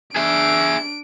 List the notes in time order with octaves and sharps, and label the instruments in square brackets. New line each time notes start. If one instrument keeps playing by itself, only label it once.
[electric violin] D4 D7 [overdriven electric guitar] G#4 E5